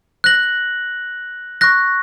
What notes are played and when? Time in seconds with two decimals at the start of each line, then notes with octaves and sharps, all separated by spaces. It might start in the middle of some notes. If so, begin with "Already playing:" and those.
0.24 F#6 A#6 F#7
1.61 C#6 F#6 A#6